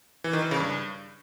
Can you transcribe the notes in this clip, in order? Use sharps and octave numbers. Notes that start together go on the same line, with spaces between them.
E3
D#3
E3
C#3
G2